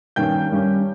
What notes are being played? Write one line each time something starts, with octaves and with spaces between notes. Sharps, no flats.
G2 D#3 A#3 C#4 G5 G6
G2 G3 C#4